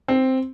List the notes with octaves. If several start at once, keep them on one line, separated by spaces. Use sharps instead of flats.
C4